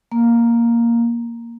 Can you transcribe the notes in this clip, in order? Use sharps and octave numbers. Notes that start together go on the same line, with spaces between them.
A#3